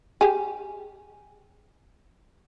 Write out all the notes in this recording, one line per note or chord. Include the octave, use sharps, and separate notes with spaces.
G4 G#4